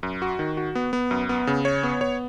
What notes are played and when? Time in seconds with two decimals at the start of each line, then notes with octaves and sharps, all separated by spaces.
0.03 F#2
0.22 F#4
0.39 D#3
0.57 F#4
0.75 B3
0.93 B3
1.11 F#2
1.29 B3
1.47 C#3
1.65 C#5
1.83 B3
2.01 C#5